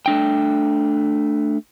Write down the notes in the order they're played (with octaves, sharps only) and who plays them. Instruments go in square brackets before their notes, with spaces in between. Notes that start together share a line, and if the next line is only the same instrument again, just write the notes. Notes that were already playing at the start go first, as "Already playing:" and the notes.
[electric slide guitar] A3 D4 G5